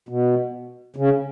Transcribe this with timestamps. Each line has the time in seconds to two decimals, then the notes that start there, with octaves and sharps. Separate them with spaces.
0.09 B2
0.96 C#3